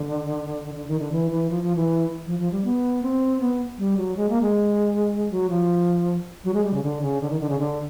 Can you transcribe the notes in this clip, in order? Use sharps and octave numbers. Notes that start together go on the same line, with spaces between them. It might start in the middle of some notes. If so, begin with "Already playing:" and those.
Already playing: D3
D3
D#3
D3
E3
E3
F3
F3
E3
F3
F3
G3
B3
C4
B3
G3
F#3
G#3
A#3
G#3
F#3
F3
F#3
G#3
G3
C#3
D3
C#3
D3
D#3
D3
C#3
D3